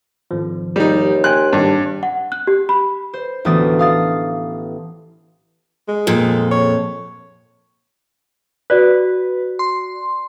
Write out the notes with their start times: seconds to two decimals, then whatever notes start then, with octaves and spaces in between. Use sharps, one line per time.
0.31 G#1 F3
0.76 D#2 G3 D#4
1.24 G5 G#5 C6 F#6
1.53 G#1 G2 G3
2.03 F#5
2.32 F#6
2.47 G4
2.69 B5
3.14 C5
3.45 A1 D2 E3 B3 D#6 A6
3.79 F5 D#6 A6
5.88 G#3
6.07 F2 A#2 A4
6.51 C#5
8.70 F#4 B4 D5 F#6
9.59 C6